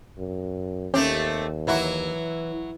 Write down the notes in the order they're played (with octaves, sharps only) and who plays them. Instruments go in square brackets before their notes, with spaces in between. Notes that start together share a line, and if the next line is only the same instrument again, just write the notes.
[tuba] F#2
[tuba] D#2 [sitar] A3 C4 G4 [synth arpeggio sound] C#4
[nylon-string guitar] E3 [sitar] F#3 E4 F#4